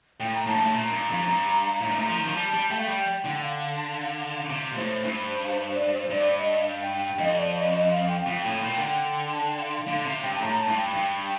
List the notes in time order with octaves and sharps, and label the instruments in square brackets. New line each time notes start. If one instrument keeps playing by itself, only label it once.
[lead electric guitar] A2 [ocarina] G5
[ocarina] A#5
[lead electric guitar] A2 [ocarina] A5
[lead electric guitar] G2
A2
[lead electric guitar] A#2 [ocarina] A#5
[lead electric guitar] G2
F2
G2
A2
G2
A2
F3
D#3
F3
[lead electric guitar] G3 [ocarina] A5
[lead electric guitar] G3
[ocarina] A5
[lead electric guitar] A3 [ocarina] G5
[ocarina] F5
[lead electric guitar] G3 [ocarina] G5
[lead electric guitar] D3
[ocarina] G5
F5
[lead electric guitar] C3
A#2
[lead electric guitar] A2 [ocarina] C5
[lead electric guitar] G2 [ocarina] C5
[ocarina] C5
D5
C5
C5
[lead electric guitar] G2 [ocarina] D5
[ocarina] D#5
F5
G5
G5
[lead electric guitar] F2 [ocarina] D#5
[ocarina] D5
D#5
D#5
F5
G5
F5
[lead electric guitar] F2
[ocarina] G5
[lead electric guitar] A2
A#2
D3
[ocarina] A5
G5
F5
[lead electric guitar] D3 [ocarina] F5
[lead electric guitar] C3 [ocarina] F5
[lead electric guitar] G2 [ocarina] G5
[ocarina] A5
[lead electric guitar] A2 [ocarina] A#5
[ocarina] A5
[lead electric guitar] G2
[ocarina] G5
[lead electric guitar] G2